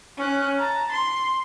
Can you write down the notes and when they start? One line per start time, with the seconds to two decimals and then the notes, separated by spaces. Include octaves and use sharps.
0.18 C#4 F#6
0.59 A5 A#5
0.92 C6